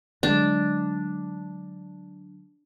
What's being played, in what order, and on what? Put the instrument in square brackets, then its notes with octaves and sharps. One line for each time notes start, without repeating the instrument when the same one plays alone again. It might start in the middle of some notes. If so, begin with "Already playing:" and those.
[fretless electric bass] D3 F#3 G#3 [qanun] D4